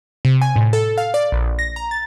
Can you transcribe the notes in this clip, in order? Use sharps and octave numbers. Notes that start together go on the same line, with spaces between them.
C3
G#5
A2
A4
F5
D5
A#1
A#6
A#5
A6